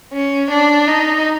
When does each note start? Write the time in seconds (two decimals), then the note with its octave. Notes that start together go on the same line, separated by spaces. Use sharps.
0.13 C#4
0.51 D4
0.88 D#4